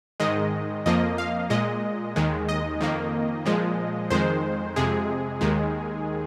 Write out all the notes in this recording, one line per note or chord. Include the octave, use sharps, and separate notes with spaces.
G#2 D#3 G#3 D#5
F2 F3 A#3 D#5
F5
A#2 G#3 D#5
D#2 D#3 G#3
D#5
F2 D#3 A#3
A#2 F3 G#3
F2 D#3 G#3 C5
F2 C3 G#3 G#4
D#2 D#3 G#3